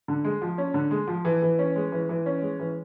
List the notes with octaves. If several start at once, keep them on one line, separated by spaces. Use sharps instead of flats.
D3
G#3
F3
C#4
D3
G#3
F3
E3
E3
C#4
G#3
E3
E3
C#4
G#3
E3